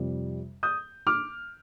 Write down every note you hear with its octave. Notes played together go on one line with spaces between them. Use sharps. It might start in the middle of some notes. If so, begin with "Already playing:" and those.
Already playing: F2 C3 G3
D#6 G6
D6 F6